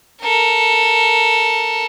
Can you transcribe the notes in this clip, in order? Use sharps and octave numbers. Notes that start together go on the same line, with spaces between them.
A4 A#4